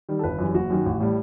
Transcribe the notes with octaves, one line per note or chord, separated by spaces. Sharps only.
D#3 G3
A4
G1 B4
F#2 E3 G3
F#1 F#4
F#2 D#3 F#3
A1
A2 G3